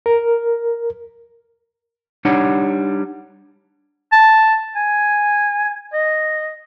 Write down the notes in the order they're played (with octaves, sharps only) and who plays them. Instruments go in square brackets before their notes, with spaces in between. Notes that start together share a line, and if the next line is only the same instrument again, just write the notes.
[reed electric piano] A#4
[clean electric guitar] G3 D4 D#4 C#5 F#5
[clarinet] A5
G#5
D#5